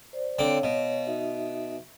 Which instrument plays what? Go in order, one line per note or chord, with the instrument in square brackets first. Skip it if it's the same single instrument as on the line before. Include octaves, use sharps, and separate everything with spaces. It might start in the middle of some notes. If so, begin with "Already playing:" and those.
[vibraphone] C5 D5
[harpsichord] D3 C4 D6 [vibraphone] C#5 F5
[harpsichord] B2
[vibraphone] D#4 F#4 E5